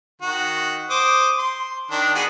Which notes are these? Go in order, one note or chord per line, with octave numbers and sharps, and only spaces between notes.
D#3 F#4
C5 D6 D#6
C6
D#3 D4
B3 F#4 G#4